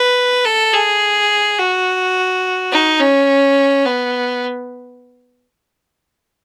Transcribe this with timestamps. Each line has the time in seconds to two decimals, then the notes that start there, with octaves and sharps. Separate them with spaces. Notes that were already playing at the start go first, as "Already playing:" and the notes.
Already playing: B4
0.45 A4
0.73 G#4
1.58 F#4
2.72 D#4
3.00 C#4
3.85 B3